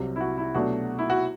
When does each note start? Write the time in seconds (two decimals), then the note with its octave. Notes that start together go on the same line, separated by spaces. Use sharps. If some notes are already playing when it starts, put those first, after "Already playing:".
Already playing: C2 C3 F#3
0.16 E4
0.20 F#4
0.38 E4
0.54 B2 F#3 A3 D4 F#4
0.99 E4
1.10 F#4